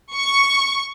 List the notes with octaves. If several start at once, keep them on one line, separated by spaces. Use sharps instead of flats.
C#6